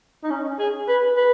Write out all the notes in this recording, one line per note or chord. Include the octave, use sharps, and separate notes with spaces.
D#4
C#4
G#4
B4
B4